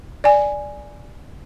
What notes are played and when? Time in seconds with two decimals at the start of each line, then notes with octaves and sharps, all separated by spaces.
0.24 D5 G#5